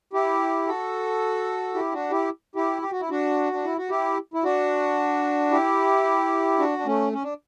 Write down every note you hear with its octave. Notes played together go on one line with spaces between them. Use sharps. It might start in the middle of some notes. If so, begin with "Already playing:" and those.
E4 G4
F#4 A4
E4 G4
D4 F#4
E4 G4
E4 G4
G4
F#4
E4
D4 F#4
D4
E4
F#4
E4 G4
E4
D4 F#4
E4 G4
D4 F#4
D4
A3 C#4
C#4
D4